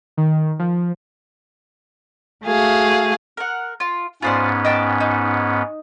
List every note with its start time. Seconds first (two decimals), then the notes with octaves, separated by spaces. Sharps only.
0.17 D#3
0.59 F3
2.45 A3 F#4 G#4 F5
3.37 A#4 F#5
3.80 F4
4.22 G#2 B3 C#4 F4 C5 D5
4.65 D#5 G5 A5
5.00 D#4